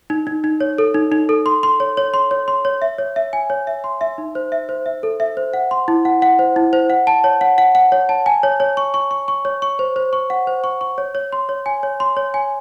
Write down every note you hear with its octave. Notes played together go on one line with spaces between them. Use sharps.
D#4
D#4
D#4
C#5
A4
D#4
D#4
A4
C6
C6
C#5
C#5
C6
C#5
C6
C#5
E5
C#5
E5
G#5
C#5
E5
C6
E5
D#4
C5
E5
C5
E5
A4
E5
C5
F#5
C6
E4
F#5
F#5
C5
E4
C5
F#5
A5
C#5
F#5
F#5
F#5
C#5
A5
G#5
C#5
C#5
C#6
C#6
C#6
C#6
C#5
C#6
C5
C5
C#6
F#5
C5
C#6
C#6
C#5
C#5
C6
C#5
G#5
C#5
C6
C#5
G#5